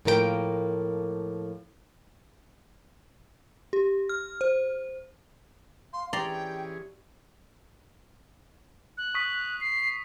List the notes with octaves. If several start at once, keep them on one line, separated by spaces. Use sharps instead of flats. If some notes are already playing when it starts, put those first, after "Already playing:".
A2 F3 A#3 A#4 C5 G5
G4
F6
C5
F5 C6
E3 C#4 G4 G#4 D5 G5 A#5 C6
F#6
C#6 D#6 B6
C7